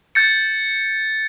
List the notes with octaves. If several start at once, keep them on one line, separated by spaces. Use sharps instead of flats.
G6 A6 C#7